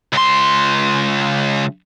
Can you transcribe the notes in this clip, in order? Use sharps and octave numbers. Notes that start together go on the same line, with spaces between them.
C#2 C6